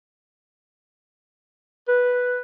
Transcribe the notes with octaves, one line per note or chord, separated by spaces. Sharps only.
B4